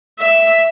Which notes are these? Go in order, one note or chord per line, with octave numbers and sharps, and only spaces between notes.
E5